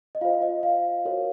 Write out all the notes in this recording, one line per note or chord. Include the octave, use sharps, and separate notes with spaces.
D#5
F4 C5 F5
D#5
F5
F#4 A#4 C#5